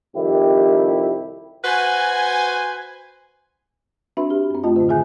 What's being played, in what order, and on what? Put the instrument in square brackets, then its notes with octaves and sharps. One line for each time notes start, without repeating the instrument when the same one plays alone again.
[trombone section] C2 F2 D#3 E4 G4
[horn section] F#4 B4 C5 G#5
[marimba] C4 D4 F#4 B4 E5 B5
G4
F#2 C4
F#2 A3 F4 D#5 A5
A2 D3
D#3 G#4 E5 G#5 F#6 G6